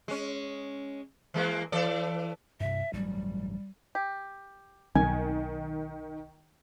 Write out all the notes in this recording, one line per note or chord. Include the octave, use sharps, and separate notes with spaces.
G#3 C#4
E3 G#3 A#3
E3 A4 D5
G2 C3 E5
A1 G2 F#3 G3
G4
B1 D#3 G#5